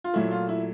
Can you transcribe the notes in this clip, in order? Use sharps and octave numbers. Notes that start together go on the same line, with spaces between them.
F4
A#2 F#3 A3 E4
F4
E4